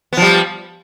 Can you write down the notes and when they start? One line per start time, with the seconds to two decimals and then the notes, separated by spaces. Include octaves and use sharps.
0.13 B3
0.17 F3
0.22 G3